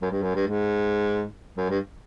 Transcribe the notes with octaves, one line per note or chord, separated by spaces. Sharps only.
F#2
G2
F#2
G2
G#2
F#2
G2